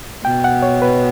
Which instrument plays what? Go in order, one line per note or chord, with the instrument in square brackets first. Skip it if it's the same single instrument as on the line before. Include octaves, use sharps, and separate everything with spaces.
[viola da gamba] B2 [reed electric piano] G5
[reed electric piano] F#5
C#5
B4